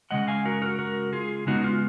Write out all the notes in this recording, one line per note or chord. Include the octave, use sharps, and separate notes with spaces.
C#3 F3 G#3 D#5 F#5
F5 G#5
F#4 A#4
F#4 A#4
F#4 A#4
F4 G#4
C#3 G#3 B3 D#4 F#4
F4